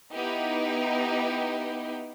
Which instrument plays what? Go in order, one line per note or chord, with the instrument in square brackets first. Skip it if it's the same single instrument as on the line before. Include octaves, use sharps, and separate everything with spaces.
[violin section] B3 D#4 E4 G4